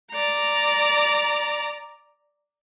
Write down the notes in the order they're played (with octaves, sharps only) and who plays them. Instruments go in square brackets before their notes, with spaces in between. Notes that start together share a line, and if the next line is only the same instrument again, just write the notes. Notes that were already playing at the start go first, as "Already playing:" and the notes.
[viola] D5 A#5